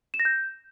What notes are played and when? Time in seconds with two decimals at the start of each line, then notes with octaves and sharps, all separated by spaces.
0.14 E7
0.20 A#6
0.25 G6